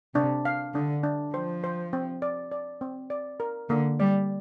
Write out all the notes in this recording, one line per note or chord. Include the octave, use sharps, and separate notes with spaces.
C3 D4
F5
D3 D4
D4
F3 C5
C5
C4
D5
D5
C4
D5
A#4
D3 A#3
G3 D5